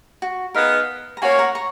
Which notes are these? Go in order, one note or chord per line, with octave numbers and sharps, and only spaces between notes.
F#4
B3 D#4 G#4 A#4 B4 F5
A#5
A#3 C#4 F#4 C#5 F5 G#5
F#5 A#5
A#5 C#6